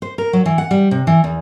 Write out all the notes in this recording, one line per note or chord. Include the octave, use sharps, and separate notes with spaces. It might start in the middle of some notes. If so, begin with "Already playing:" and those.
C5
A#4
F#3
E3
F#5
G3
C3
E3
E2